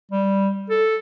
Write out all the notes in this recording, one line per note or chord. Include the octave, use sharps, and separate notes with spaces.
G3
A4